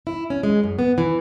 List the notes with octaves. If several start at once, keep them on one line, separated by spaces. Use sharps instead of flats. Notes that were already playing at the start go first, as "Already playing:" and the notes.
E4
C#4
G#3
F#2
B3
E3